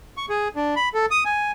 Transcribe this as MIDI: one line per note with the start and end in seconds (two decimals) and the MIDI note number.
0.17 0.26 85
0.29 0.48 68
0.56 0.75 62
0.76 0.89 83
0.94 1.06 69
1.11 1.24 87
1.25 1.52 80